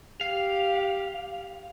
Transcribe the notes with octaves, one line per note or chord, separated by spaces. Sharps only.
G4 F5